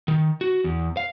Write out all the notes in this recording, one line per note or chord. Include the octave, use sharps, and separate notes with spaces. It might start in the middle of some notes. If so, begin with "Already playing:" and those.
D#3
F#4
E2
F5